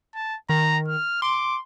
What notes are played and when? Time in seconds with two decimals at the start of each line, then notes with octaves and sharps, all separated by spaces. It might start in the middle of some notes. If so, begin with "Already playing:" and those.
0.15 A5
0.49 D#3 A#5
0.88 F6
1.22 C6 D6